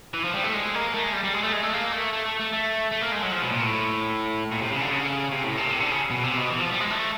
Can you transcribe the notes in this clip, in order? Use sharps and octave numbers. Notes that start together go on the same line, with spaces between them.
E3
F3
G3
A3
G#3
A#3
A3
G#3
G3
G3
G#3
A3
G#3
A3
A#3
A3
A3
A3
A3
A3
A3
A#3
G#3
F#3
F3
B2
A#2
A2
A#2
C3
C#3
D3
C#3
C3
A2
A#2
C3
D3
C#3
B2
C3
B2
E3
F3
G3
G#3
A3